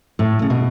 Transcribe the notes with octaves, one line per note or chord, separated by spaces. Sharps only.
A2
C#3
B2